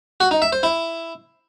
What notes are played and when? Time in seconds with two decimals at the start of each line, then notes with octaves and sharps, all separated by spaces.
0.20 F#4
0.31 D#4
0.42 E5
0.52 C5
0.63 E4